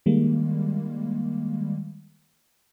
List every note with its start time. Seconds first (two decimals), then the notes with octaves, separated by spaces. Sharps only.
0.06 D#3 G3 G#3 A#3